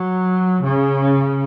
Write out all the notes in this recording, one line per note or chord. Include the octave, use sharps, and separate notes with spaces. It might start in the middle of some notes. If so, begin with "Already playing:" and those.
Already playing: F#3
C#3